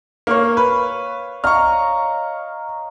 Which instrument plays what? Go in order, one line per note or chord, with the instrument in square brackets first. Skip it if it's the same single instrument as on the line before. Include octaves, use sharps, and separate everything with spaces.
[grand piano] A#3 [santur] C#5 F5
[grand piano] B4
[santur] D#5 F5 A#5 [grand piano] C#6 F6